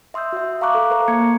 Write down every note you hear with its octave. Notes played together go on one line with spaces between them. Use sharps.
E5 C6 D#6 E6 G6
F#4 E5
F5 A5 A#5 C#6 D6 F#6
A4 F5
A#4 C5 A#5 D6
A#3 G#6 C#7